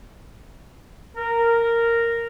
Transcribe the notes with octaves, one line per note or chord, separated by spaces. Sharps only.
A#4